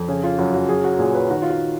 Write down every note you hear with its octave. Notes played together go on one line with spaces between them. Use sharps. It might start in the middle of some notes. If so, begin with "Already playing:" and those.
Already playing: F2
C#3 G#4
F4
F#2 F#4
F#4
F#3 G#4
F#4
A#2 G#4
B4
D#3 F#4
F4
F#4